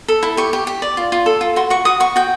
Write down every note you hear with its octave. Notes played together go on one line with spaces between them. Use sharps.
A4
E4
G4 C#6
G4
G4
D5
F4
F4
A4
F4
F#4 C6
F#4 C#6
F#4 D#6
F#4 C#6
F#4 G5